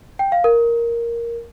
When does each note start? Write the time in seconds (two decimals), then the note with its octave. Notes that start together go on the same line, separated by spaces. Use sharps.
0.19 G5
0.32 F5
0.44 A#4